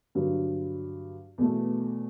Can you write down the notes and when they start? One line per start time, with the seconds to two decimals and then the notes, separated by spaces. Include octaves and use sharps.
0.15 G2 D3 F#3
1.38 E2 B2 A3